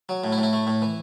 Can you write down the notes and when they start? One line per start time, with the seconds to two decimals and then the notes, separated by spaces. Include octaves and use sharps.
0.09 F#3
0.24 A2
0.32 E4
0.38 A2
0.43 E4
0.53 A3
0.67 A2
0.82 E3